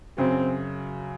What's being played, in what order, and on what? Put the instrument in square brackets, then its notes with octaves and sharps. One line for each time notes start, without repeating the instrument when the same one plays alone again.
[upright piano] F#2 C#3 F#3 [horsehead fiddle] C4